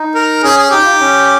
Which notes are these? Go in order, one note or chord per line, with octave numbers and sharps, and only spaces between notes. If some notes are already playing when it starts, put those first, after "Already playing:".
Already playing: D#4
A#4
C#4 G#4
G#4
D#4 G4
F4
D#4
C#4